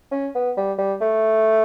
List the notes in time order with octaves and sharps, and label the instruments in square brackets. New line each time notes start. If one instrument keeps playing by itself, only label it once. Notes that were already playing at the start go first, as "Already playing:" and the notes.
[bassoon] C#4
B3
G3
G3
A3